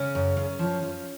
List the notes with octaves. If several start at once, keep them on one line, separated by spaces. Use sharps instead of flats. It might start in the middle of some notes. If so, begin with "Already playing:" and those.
Already playing: C#3 C#4
F#2
F#2
F3
F3